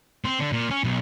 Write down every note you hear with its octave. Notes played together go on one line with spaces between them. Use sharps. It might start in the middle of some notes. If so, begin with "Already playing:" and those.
C4
D3
A#2
C#4
B1